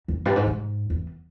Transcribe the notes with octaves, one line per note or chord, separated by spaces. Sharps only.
E2
G2
G#2
G#2
E2